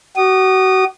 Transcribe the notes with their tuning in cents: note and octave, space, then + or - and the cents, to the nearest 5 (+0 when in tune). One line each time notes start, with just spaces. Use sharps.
F#4 +30 D#6 -25